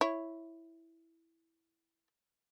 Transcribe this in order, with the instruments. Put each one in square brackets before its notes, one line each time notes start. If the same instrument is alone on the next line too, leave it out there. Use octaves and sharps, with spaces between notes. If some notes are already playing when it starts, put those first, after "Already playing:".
[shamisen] E4 C#5